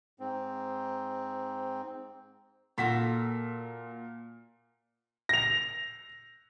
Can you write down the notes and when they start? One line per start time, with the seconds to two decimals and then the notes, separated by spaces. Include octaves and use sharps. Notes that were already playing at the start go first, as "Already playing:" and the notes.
0.20 G#2 C4
2.78 A#2 F4 F#4 A4 B6
5.29 A#6 F7